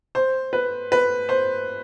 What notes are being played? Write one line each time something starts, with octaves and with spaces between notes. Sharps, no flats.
C5
B4
B4
C5